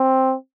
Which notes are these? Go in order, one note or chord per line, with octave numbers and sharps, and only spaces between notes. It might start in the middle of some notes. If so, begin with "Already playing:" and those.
Already playing: C4